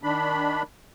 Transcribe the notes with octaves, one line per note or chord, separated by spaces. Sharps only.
D#3 D4 B5